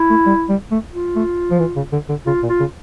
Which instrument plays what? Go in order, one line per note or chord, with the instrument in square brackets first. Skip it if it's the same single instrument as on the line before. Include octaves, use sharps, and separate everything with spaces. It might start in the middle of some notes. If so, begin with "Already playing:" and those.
Already playing: [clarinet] E4
[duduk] A3
G3
G3
A3
[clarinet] F4
[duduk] A3
F3
E3
C#3
D3
D3
[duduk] C#3 [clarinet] F4
[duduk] A#2
[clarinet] F4
[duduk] C#3